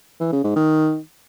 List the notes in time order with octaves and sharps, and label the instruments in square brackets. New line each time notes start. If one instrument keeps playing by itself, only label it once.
[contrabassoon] E3
C#3
G#2
D#3